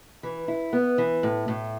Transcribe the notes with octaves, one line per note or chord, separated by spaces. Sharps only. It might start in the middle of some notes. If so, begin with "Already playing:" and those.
E3
E4
B3
E3
A2
A2